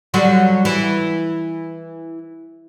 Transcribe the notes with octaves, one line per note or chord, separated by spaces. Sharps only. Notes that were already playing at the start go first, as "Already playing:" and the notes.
D3 F#3 G3
E3